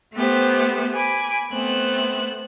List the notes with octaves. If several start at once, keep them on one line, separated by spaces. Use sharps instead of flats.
A3 B3 G4 C5
G#5 B5 D6
A3 B3 C4 F#6